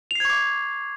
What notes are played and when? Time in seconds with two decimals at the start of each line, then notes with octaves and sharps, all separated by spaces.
0.11 F7
0.15 C7
0.20 G#6
0.25 C#6
0.30 D6